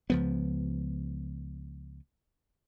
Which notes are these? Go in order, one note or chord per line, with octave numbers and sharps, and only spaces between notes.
C#2 F3 B3